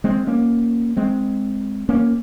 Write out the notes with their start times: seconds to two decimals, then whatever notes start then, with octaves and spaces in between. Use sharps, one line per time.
0.04 G#3 C4
0.27 A#3 C#4
0.97 G#3 C4
1.89 A#3 C#4